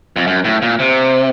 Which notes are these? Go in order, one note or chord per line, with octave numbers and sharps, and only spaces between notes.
F2
F#2
A2
A#2
C3